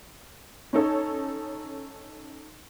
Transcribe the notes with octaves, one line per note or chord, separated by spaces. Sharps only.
C#4 D#4 A4 C#5